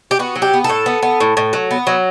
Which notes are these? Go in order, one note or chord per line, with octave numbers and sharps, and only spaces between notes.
G4
B3 F#4
F#3
G4
B3
A4
A2
B3
B3
A2
A2
F#3
B3
F#3